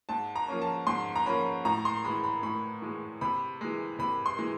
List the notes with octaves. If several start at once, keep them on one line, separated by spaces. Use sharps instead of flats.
G#2 A5
A#5
F3 A#3 C#4
A5
G#2 C6
A#5
F3 A#3 C#4 B5
A2 A#5
C6
E3 G#3 B5
B5
A2 B5
E3 G#3
C3 B5
E3 G#3
C3 B5
C6
E3 G#3